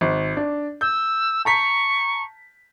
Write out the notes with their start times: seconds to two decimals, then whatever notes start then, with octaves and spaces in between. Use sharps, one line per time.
0.01 G#1
0.37 D4
0.81 E6 G6
1.45 A5 A#5 C#6 B6